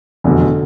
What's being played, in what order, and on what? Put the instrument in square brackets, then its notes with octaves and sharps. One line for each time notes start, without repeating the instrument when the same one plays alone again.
[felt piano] F1 E2 B2 [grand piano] D3